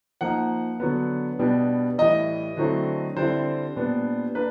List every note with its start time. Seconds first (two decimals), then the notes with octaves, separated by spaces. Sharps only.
0.21 F3 A#3 D#4 F#5
0.80 D3 F#3 B3
1.39 B2 G3 B3 D4
1.98 A2 E3 G3 D#5
2.57 D3 F#3 A3 C4 E4
3.16 D3 G3 C4 E4 C5
3.76 A#2 G3 B3 D4
4.35 A#3 D4 B4